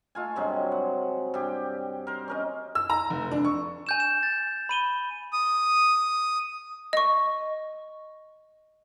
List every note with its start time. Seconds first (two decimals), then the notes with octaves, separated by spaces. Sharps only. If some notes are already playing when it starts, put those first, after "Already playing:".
0.15 A3 F4 G#5
0.36 G2 C3 F#3 G#3
0.72 F#5
1.34 G2 G4
2.07 A#4 C5
2.28 C#4 A#4 D#5
2.75 E6
2.90 A#5
3.10 F1
3.31 D4
3.45 C#6
3.87 G#5 G6 E7
4.00 E7
4.23 A6
4.69 B5 D#7 G7
5.33 D#6
6.93 D#5 C#6